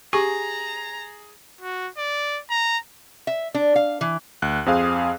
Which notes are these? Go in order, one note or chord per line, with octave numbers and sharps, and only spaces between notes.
G4 G#4 A#5 C#6
F#4
D5
A#5
E5
D4
F5
E3
D2 F#6
F2 C4 G#4 F5 D#6